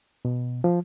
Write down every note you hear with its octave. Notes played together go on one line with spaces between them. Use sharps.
B2
F3